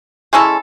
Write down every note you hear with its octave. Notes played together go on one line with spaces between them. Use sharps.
G#3 C#4 E4 A4